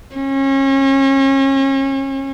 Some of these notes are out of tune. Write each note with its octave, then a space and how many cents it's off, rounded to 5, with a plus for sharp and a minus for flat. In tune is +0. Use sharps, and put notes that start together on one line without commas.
C#4 -35